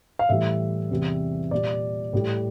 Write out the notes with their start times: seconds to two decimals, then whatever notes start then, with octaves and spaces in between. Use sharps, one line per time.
0.19 F5
0.29 A2 E3 G3 E5
0.91 E2 C3 E3 G3
1.51 A#2 G3 D5
2.13 A2 G3